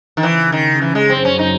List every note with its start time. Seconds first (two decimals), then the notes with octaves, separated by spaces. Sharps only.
0.17 D#3
0.23 C#3 E3 C#4
0.52 D#3
0.81 E3
0.95 G#3
1.10 F#2 F#3 C4
1.25 C#4
1.39 D#4